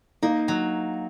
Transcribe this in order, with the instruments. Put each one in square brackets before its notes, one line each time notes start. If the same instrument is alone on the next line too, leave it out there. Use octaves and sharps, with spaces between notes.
[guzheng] A#3 [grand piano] D#4
[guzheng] F#3